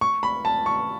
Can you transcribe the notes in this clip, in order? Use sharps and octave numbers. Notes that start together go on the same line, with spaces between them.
C#6
B5
A5
C#6